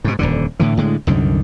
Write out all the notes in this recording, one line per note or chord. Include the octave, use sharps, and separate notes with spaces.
G#2 B2
D#1 F2 D3
A2 D3 E3
A2 D3 G#3
C2 F#2 D3 D#3